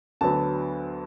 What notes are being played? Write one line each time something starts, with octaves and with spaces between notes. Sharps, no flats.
D2 D3 F#3 B3 A5